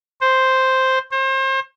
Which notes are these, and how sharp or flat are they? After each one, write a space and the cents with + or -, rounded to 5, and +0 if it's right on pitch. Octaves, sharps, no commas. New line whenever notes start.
C5 +0
C5 +35